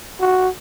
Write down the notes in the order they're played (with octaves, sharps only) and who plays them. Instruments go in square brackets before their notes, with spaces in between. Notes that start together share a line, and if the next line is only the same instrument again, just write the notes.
[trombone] F#4